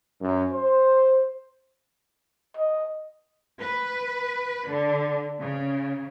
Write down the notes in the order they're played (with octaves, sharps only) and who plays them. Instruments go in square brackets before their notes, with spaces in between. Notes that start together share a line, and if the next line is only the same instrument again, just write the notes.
[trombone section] F#2
C5
[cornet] D#5
[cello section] B4
D3
C#3